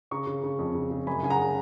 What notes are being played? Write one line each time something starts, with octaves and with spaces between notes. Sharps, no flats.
C#3 A#5 C#6
C#3
C#3
F2
C#3
C#3
F#2 G#5 B5
C#3 G#5
F#5 A#5
C#3